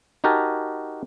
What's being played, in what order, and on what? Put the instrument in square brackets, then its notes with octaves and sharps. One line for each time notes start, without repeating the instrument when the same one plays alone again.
[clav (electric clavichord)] D#4 F#4 G4 A#4 G#5 A5